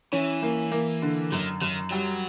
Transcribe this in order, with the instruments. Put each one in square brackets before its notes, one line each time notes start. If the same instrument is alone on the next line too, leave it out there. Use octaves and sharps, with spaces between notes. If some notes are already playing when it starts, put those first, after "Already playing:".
[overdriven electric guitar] E3 [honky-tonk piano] C#4
[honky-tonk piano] A#3
A#3
D3
[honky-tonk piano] F#2 [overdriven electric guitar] D#3
[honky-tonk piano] F#2 [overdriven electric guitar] D#3
[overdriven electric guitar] F#3 [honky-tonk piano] G3